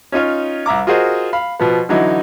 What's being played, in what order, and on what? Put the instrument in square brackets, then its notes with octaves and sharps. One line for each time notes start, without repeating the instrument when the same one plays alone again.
[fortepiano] C#4 D#4 F4 C#5
C2 E5 A#5 D6
F4 F#4 G#4 A#4 C5 D#5
F5 B5
B2 F3 B3
D3 E3 F#3 D#4 E4